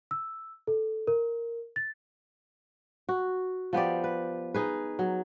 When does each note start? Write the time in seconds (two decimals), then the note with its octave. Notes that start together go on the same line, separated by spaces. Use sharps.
0.11 E6
0.67 A4
1.07 A#4
1.76 A6
3.09 F#4
3.73 F3 B3 G4 D5
4.04 B4
4.54 D#4 G#4 B4
4.99 F#3